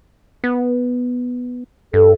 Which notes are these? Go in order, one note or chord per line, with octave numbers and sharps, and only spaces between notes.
B3
G2 A4